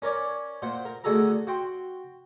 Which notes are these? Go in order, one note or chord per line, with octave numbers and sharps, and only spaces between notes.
C#4 A#4 C#5 D5
A#2 C5 F#5
A#4
D2 D3 F#4 G#4 A4 A#5
F#4 G5 C6